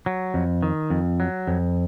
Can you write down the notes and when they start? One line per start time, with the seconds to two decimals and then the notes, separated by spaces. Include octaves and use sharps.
0.06 F#3
0.34 F2
0.63 D#3
0.90 F2
1.20 F#3
1.47 F2